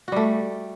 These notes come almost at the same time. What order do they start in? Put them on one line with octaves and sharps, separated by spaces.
F#4 G3 A3